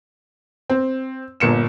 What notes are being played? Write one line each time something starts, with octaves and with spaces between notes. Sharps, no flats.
C4
G1 A#2 C#7 E7